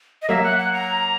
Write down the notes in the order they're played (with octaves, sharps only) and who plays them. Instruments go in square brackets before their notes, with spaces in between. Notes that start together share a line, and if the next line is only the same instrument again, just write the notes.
[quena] D#5
[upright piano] F#3 A#3 [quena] E5
[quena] F#5
F#5
A#5